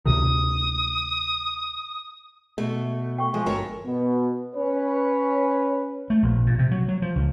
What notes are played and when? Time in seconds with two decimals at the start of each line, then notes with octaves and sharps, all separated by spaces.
0.06 D2 C3 D#3 D#6
2.58 B2 A3
3.18 G5 C#6
3.34 F3 G#3
3.46 G1 F#4 A4 A#4 C#5
3.86 B2 B3
4.55 C#4 B4 C#5
6.10 A3
6.23 A#1
6.47 A#2
6.59 C3
6.71 F#3
6.88 F#3
7.02 F3
7.16 C#2